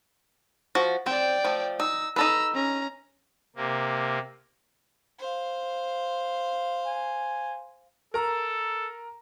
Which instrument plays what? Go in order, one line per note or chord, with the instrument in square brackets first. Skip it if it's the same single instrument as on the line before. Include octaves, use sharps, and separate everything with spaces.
[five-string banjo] F3 F#4
[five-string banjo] C4 [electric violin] D5 G5
[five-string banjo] F3 A3
[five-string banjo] D#4 [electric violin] E6
[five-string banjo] D#4 A4 B4 [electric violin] A#5 E6
[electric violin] C#4 A#5
[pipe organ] C3 A#3
[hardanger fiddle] C5 F5
[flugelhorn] G#5
[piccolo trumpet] A4 [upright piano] A#4 A#5